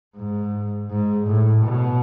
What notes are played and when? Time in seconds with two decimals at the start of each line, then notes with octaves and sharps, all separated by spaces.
0.16 G#2
0.90 G#2
1.27 A2
1.64 B2